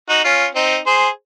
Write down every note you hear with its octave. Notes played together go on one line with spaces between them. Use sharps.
D#4 F#4
C#4 F4
C4 D#4
G#4 C5